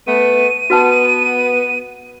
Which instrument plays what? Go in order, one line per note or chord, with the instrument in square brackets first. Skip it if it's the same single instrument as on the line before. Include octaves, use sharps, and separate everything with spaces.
[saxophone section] A3 B3 [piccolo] D#7
[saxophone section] B3 [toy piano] F#4 B4 A5